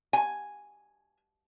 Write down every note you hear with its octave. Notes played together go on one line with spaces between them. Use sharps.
G#5